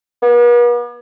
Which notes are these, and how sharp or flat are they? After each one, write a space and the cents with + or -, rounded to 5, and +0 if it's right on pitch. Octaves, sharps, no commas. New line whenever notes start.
B3 -45